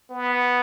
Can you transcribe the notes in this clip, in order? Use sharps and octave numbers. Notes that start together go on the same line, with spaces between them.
B3